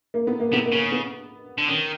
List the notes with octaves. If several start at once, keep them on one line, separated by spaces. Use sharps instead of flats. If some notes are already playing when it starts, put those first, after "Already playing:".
A#3
B3
A#3
C3 B3
A#3
C#3
B3
D3
D#3 C#4